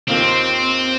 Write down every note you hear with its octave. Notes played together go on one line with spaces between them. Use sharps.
D#2 D#3 A#3 C4 F4